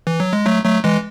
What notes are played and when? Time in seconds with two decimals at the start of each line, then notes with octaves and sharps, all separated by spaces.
0.07 E3
0.20 F#3
0.33 G#3
0.46 F#3 A3
0.65 F#3 A3
0.84 E3 G#3